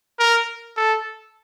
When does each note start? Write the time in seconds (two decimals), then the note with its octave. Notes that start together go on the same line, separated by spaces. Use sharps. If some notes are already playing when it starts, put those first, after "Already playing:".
0.19 A#4
0.77 A4